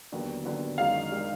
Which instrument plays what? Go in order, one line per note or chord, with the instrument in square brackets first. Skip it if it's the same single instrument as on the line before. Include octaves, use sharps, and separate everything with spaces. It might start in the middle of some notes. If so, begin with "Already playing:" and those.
[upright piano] D#2 D3 F#3 B3
D#2 D3 F#3 B3
[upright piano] F#2 D#3 G#3 D4 [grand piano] F5
[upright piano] D#3 G#3 D4